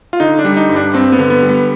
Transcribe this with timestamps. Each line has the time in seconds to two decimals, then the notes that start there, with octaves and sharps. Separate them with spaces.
0.13 F4
0.20 D3 D#4
0.39 D4
0.45 G3
0.57 D#4
0.69 G2
0.76 D4
0.94 G2 C4
1.12 B3
1.19 D3
1.30 B3
1.42 G3
1.49 B3